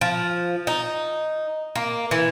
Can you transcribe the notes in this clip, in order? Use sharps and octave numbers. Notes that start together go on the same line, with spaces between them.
F3
D#4
A#3
E3